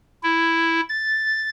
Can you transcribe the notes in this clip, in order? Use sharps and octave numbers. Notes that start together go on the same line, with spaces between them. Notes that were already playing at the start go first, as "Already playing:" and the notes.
E4
A6